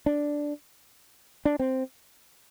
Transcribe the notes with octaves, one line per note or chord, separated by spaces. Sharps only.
D4
D4
C4